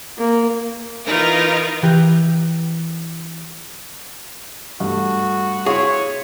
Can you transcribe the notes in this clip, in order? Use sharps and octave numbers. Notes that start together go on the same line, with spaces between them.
A#3
E3 D#4 F4 A#4 B4
E3 G4 G5 F#6 G6
G2 A3 F#4
E4 G#4 C#5 F5 C6 C#6